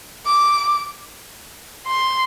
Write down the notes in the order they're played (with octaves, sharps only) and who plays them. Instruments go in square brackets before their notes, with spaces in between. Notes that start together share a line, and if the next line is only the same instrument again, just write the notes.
[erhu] D6
C6